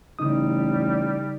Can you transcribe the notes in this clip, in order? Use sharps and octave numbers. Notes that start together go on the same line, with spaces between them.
A1 C#3 G3 D#4 D#6